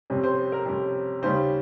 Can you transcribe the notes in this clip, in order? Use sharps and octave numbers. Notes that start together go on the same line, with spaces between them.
F2 C3 G3 C#4
C5
A#4
F2 C3 G3 C#4
D#2 C#3 G3 C#4 C5